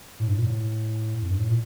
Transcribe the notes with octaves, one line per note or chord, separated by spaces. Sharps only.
A2
G2
A#2
A2
F2
G2
A2
A#2